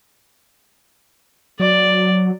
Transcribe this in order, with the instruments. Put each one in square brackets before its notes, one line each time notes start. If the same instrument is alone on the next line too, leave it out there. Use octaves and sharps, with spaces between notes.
[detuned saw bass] F#3 [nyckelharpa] D5